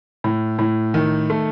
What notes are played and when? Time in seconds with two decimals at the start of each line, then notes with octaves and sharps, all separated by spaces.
0.24 A2
0.59 A2
0.94 D#3
1.30 A3